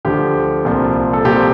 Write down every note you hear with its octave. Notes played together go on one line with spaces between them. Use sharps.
D2 D3 F3 G4
C2 A#2 F3
A4
C2 A#2 F3 G4